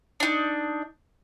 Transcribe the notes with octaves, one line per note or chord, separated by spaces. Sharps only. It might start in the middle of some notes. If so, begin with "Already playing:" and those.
D4 D#4